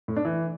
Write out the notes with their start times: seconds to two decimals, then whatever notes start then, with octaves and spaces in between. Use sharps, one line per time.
0.08 A2
0.16 D4
0.25 E3